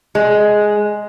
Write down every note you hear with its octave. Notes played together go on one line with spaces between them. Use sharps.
G#3